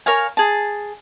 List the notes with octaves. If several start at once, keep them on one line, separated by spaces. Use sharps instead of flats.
A#4 C#5 F5 G#5
G#4 A5